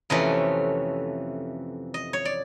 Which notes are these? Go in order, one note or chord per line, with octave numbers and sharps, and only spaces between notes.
F2 C3 E3 A3 C#4 D#5
D#5
C#5
D5